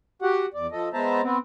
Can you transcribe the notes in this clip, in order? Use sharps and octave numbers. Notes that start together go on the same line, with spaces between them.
F#4 G4 F#5
E2 D5
F3 A4 D#5
G#3 B3 C5 E5 A5 A#5
B3 C4